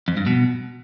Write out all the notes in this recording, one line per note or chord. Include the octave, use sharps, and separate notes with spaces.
F2
G2
B2